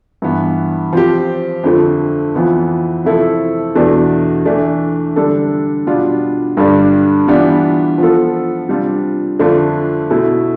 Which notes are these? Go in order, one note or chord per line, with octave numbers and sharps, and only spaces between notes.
G2 E3 B3
F3 C4 G4
F2 D3 A3
F2 E3 B3 F4
C3 F3 A3 E4 A4
E2 B2 A3 D4
E3 A3 D4
D3 G3 D4 A4
B2 G3 B3 D4 F4
G2 D3 G3 D4
E3 G3 B3 D4 F4
F3 B3 F4 A4
C3 G3 D4 F4
F2 D3 A3 D4 F4
B2 A3 E4